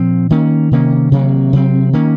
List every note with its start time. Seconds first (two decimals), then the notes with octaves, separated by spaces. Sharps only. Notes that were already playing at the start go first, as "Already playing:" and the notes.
Already playing: A#2 F3 C4
0.30 D#3 A#3 C#4
0.71 C3 D#3 A#3 C#4
1.12 C3 D#3 F#3 A#3
1.53 C3 F#3 C4
1.93 D#3 A#3 C#4